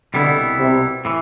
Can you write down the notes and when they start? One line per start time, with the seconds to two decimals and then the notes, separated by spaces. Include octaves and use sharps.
0.14 C2 B2 D3 G3 B3 E4
0.59 C3
1.05 A2 E3